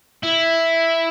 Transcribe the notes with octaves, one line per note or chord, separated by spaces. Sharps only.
E4